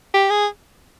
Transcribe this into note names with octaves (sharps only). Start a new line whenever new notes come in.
G4
G#4